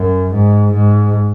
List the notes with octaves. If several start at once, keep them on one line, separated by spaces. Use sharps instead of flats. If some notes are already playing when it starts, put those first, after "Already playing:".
Already playing: F#2
G#2
G#2